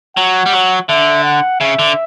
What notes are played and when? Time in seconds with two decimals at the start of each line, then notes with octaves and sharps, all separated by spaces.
0.17 F#3 F#5
0.46 G3
0.53 F#3
0.89 D3 E5
1.24 F#5
1.60 C#3 E5
1.79 D3